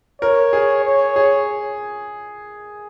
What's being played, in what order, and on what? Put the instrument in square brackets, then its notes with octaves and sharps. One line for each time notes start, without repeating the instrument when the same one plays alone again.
[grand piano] A#4 [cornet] C#5
[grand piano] G#4
[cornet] C#5
[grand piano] G#4